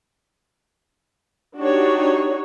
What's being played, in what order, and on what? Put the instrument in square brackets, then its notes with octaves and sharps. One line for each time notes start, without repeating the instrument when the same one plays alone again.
[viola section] D4 D#4 F#4 G4 C#5